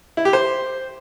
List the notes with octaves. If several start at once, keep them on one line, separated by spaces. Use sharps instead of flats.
E4
G4
C5